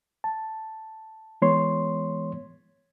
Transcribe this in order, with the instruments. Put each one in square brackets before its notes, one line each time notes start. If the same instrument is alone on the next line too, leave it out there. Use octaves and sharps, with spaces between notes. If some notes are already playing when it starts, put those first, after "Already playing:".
[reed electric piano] A5
E3 G#3 B3 C#5 C6